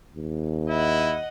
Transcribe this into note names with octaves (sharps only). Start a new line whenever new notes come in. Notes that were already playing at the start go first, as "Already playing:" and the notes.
D#2
E4 D#5 F#5